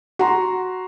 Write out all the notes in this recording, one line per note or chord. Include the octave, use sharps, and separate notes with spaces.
F#4 A#5 C6